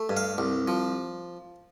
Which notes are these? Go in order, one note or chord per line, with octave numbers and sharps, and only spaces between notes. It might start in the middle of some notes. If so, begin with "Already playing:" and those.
Already playing: A3
G2
F5
C2
F3